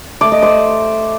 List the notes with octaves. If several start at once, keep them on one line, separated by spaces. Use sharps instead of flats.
A3 D5
D#5
C5 D5